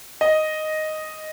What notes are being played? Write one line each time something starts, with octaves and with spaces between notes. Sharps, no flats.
D#5